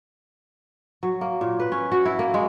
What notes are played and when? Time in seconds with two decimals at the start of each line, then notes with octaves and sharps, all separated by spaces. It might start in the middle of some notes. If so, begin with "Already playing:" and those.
1.03 F#3
1.21 A#3
1.41 A#2
1.60 B4
1.72 C#4
1.92 F#4
2.05 E4
2.19 A#3
2.34 G#3